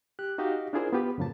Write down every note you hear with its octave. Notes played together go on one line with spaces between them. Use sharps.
G4 F#6
D#4 F#4 G4 D#5 F5
D4 E4 F4 G#4 A#4 C5
B3 F4 G4 B4
F#2 A2 C#3 F3 A#3 A5